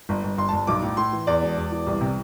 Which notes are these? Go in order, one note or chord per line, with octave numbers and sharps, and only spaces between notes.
G1
G1
G1 C6
A5
G1
B1 D6
A2
A2 C6
E3
E2 D5
E1
E1
E3
C2
C3